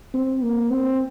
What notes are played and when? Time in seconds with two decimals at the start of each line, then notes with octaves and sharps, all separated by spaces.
0.14 C4
0.42 A#3
0.71 C4